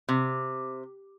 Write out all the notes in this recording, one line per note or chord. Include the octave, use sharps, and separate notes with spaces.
C3